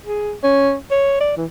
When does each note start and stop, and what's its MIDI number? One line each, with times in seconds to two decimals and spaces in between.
0.06 0.33 68
0.43 0.74 61
0.91 1.19 73
1.20 1.33 74
1.37 1.45 52